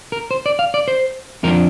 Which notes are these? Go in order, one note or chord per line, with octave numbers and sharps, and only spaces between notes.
A#4
C5
D5
F5
D5
C5
F2 F3 D4 A#4